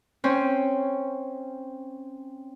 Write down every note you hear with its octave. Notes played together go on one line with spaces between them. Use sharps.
C4 C#4